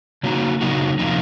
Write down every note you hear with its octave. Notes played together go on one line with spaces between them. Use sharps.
C#3 F#3 A#3 D#4 F#4
C#3 F#3 A#3 D#4 F#4
C3 F3 A#3 D#4